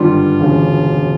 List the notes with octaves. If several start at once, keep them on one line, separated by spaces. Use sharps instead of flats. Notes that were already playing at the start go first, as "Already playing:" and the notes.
Already playing: G#1 G2 D3 G3 F4
E1 D2 C#3